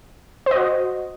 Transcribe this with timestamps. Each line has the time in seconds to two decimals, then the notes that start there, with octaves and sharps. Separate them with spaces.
0.46 C5
0.51 D#5
0.56 F#4